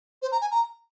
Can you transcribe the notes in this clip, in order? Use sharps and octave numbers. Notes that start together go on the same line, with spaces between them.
C5
A#5
G#5
A#5